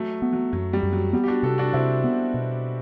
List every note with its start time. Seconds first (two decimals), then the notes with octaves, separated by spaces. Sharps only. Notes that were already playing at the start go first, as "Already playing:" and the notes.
Already playing: F#3 A3
0.22 B3
0.33 F#3
0.53 F#2 F#3
0.73 G3
0.83 F#2
0.93 F#3
1.13 G3 B3
1.24 G4
1.28 D4 F#4
1.43 C3 F#4 A4
1.58 D4 F#4
1.73 C3 C4 E4
2.04 B3
2.34 B2